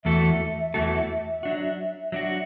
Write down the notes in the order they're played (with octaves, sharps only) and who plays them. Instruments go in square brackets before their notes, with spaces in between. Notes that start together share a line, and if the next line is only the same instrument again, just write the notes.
[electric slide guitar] E2 E3 A3 F#4 A4 [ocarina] E5
[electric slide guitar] E2 E3 A3 F#4 A4
F#3 D4 F#4
F#3 D4 F#4